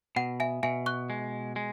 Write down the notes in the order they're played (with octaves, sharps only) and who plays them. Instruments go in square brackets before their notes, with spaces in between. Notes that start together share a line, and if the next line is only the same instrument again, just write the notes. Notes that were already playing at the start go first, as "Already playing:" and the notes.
[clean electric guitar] B2 [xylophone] F#5
[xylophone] E5 G#5
[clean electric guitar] B2 [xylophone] E5 G#5
[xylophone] C#6 F#6
[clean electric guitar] G#3
G#3